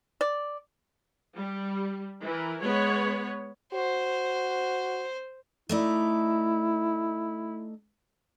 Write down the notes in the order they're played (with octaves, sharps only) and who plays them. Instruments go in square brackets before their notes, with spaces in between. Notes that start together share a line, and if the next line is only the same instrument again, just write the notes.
[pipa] D5
[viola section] G3
E3 A#4
G#3 B3 C#5
[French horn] F#4 [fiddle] C5
[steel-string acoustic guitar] A3 D#4 D5 [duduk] E4